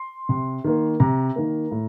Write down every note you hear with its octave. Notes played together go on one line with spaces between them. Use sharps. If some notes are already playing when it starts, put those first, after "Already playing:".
Already playing: C6
C3
D#3 A#3
C3 A#5
D#3 A#3
A2